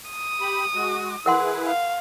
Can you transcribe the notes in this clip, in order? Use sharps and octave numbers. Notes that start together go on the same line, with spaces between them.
D#6
G4 B5
G#3 F#4
E4 G#4 A#4 B4 F#5 C6
F5